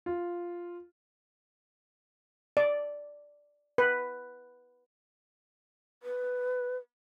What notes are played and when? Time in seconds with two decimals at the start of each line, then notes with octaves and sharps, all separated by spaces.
0.06 F4
2.57 D5
3.78 B4
6.03 B4